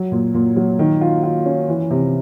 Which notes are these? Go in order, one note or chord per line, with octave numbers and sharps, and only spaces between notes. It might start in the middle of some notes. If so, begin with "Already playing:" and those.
Already playing: F#3
A#2
A#2
F#3
D#3
F4
F4
C#4
E3
C3